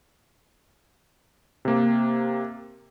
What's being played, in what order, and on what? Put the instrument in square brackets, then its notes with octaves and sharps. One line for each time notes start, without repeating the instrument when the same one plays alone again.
[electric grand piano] C3 A#3